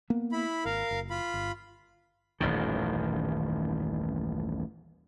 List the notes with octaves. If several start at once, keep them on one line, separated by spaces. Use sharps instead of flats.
A#3 B3
E4 B5
G#1 A#4 F5
F#1
F4 B5
G1
D#1 A1 F#2 D#3